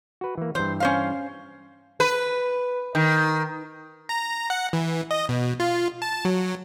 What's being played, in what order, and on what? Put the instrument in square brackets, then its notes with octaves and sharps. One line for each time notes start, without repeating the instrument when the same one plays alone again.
[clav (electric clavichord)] F#4 B4
E3 A#3
[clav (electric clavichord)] G2 E3 [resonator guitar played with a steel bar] C5
[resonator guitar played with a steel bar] C#4 C5 F5
[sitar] B4
D#3
[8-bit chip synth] A#5
F#5
E3
D#5
B2
F4
A5
F#3